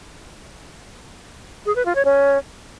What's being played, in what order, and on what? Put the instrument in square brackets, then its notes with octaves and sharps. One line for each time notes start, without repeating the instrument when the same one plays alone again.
[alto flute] G#4
B4
F4
C#5
C#4